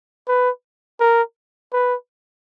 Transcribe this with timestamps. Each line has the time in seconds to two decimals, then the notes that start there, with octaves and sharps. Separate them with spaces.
0.28 B4
1.00 A#4
1.73 B4